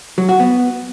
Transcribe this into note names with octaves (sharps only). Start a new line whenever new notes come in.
F#3
F#4
B3